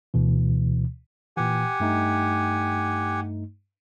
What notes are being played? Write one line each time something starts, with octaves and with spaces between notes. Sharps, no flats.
D2 B2 E3
A#2 E3 G4 F#5 G#5
G2 A3 D#4